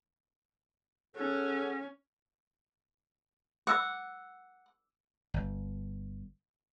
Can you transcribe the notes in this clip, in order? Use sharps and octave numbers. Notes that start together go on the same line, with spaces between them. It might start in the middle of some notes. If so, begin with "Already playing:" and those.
C#4 G#4 A4 F#5
F#5 D6 E6
G1